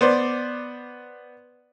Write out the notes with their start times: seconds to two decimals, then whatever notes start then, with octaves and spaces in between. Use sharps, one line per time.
0.01 B3 C5 D5